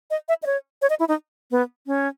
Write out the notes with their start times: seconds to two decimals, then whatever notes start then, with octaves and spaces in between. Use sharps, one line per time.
0.10 D#5
0.28 E5
0.43 D#5
0.46 C#5
0.82 C#5
0.90 D#5
0.99 E4
1.08 D#4
1.51 B3
1.87 C#4